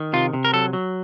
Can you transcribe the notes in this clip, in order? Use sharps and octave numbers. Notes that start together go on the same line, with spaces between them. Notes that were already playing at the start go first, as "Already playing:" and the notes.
Already playing: D#3
C3 F4
C3
A#4
F#3 A4
F#3